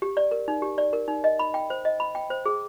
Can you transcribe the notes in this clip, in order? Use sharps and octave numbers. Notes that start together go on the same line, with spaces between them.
G4
D5
A#4
D#4
G4
D5
A#4
D#4
D#5
B5
G5
C5
D#5
B5
G5
C5
G#4